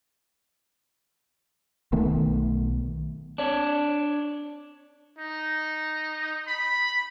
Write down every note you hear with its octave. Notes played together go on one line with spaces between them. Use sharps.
B1 D#3 A3 B3
D4 C#5
D#4
B5